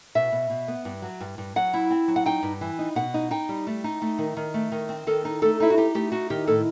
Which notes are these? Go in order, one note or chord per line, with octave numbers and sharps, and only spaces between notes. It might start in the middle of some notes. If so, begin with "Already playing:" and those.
B2 E5
B2
B2
B3
G2
F#3
G2
G2
F#3 F#5
E4
C4
F#3
F#5
D#4 G5
G2
E3
D#4
B2 F#5
D#4
D#4 G5
G3
A3
D#4
A3
D#3
D#3
A3
D#3
C4
D#3 A4
D#4
A3 A4
D#4 E4
F#4
D#4 G4
A3 G4
D#4 F#4
D#3 G4
A2 A4